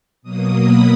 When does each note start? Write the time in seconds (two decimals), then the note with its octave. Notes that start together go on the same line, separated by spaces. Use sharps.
0.22 B2 F#3 A#3 D#6
0.59 B5